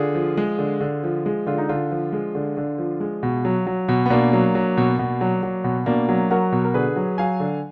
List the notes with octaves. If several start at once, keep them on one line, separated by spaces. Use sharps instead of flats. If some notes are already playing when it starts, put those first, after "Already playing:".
Already playing: D3 F4 G#4
F3
G#3
D3
D3
F3
G#3
D3 F4
D#4
D3 D4 F4
F3
G#3
D3
D3
F3
G#3
B2
F#3
F#3
B2
B3
B2 A#3 D4
F#3
F#3
B2
B2
F#3
F#3
B2
B2 A#3 D4
F#3
F#3 F#4 A#4
B2
A#4
D3 G#4 B4
F#3
F#3 F5 G#5
D3